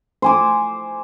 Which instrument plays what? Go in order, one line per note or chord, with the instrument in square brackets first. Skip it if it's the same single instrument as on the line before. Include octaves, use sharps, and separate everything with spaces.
[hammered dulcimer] C5 G#5 D6